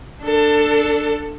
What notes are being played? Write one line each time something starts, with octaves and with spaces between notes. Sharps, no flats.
D4 A4